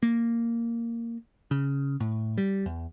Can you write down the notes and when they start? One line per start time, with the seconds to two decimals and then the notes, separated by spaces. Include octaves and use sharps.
0.03 A#3
1.51 C#3
2.00 A2
2.38 G3
2.66 E2